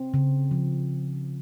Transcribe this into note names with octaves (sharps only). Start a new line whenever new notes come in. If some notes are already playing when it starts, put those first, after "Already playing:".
Already playing: C4
C#3
F3